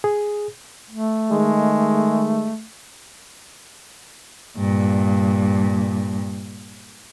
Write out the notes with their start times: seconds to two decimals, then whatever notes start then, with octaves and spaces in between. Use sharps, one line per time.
0.04 G#4
0.91 A3
1.31 D#3 G#3
4.58 G2 A#2